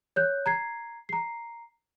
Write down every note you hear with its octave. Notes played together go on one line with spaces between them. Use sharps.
C#5 F#6 G6
A#5 G#6 C7
A#5 C7